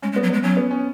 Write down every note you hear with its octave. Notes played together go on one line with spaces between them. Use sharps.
G#3 C#4
G#3
B3
F#3
B3
G#3
F#3 C#4
B3
C#4